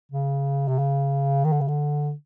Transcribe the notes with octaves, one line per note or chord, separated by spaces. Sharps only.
C#3
C3
C#3
D#3
D3
C#3
D3